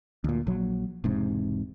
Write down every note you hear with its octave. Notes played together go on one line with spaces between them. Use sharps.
D2 A#2
A#1 F#3
E1 G#2 C3